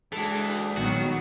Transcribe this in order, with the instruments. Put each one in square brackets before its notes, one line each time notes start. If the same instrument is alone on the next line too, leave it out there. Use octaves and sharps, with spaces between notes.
[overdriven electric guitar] E3 [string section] G#3 D4 [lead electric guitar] F#4 A4
[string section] A#1 [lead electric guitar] D#3 [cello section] F#3 B3 [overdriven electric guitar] F#4